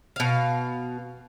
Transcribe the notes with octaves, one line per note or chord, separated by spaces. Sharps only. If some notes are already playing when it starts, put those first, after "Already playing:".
B2 F5